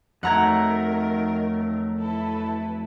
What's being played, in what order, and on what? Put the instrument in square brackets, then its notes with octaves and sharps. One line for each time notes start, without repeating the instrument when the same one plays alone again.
[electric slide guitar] F2 F#3 A3 [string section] D#3 A#4 [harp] F#5 A#5 G#6
[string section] E4 A4 B4